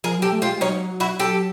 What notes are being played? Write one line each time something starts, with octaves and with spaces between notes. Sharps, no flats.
F3 G#4 A#4
F#3 G4 A4
A3
F4 G4
G#3
F#3 C#4 D#4
E4 F#4
G4 A4